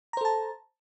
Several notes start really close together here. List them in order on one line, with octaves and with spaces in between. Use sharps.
A#5 C5 A4 A5